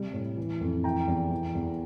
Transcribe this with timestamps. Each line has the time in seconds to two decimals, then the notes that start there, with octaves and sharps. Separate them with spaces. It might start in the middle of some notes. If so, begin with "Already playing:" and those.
Already playing: C3 G3
0.13 A2
0.37 E3
0.61 F2
0.84 E3 G5 A#5
1.08 E2
1.31 E3
1.55 E2